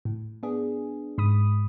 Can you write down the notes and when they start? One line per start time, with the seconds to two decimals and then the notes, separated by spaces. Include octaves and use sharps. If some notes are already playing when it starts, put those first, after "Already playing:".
0.05 A2
0.43 B3 D4 G#4
1.18 G#2 B5 D#6